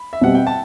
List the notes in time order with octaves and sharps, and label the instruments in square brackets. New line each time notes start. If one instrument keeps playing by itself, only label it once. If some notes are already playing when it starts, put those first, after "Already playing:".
Already playing: [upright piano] B5
E5
[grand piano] B2 G3 C4 [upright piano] F#5
[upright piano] G5
A5